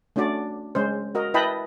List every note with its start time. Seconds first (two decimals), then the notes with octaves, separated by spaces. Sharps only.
0.16 A3 C#4 D4 F#4 D5
0.75 G#3 C#4 C5
1.15 F#4 A#4 D#5
1.34 E4 B4 D#5 G5 A5 B5